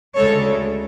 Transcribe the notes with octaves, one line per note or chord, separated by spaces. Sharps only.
D2 C#3 G#3 A4 C#5